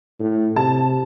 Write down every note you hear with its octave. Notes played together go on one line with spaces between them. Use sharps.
A2
C3 A5